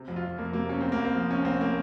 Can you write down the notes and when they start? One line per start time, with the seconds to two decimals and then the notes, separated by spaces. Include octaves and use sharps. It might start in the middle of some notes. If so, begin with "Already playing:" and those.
Already playing: C3
0.08 F2
0.16 F4
0.23 F2
0.38 F2 A#3
0.53 C3 A#3
0.69 C3 C#4
0.81 C2 C4
0.92 A#3
0.99 C2
1.05 C4
1.15 F3
1.31 C3 C#4
1.45 C2 C4
1.61 A#3